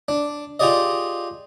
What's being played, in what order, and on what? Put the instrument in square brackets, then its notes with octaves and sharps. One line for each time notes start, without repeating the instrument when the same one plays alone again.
[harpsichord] D4
F4 G4 G#4 D5 D#5